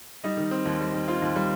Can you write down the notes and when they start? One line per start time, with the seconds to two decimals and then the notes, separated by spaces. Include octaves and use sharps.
0.24 G3 D#4 D#5
0.37 D#3
0.51 C4
0.66 D#2
0.80 G3
0.94 D#3
1.08 C4 F4 F5
1.22 D#2
1.36 G3